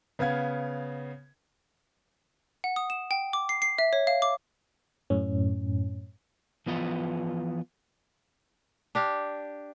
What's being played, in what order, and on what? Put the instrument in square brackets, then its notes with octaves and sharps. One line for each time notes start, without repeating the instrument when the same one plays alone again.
[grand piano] C#3 B3 F5 G#6
[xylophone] F#5
D#6
E7
G5
D6
C7
C7
E5
C#5
F5
D6
[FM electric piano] F#2 A2 C#4
[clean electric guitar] E3 F3 B3 F4 B4 D#5
[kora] D4 G4 F5